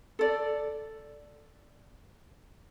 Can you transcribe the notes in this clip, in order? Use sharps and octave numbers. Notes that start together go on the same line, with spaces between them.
A4 D5